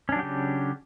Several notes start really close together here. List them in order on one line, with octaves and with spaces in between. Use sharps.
C#4 D4 F#3 G4 C#3